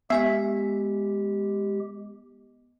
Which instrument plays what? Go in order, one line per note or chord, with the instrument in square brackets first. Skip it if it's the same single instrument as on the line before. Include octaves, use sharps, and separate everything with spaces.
[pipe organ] G#3 G4 [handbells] B3 G#5 B6 [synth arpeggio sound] E5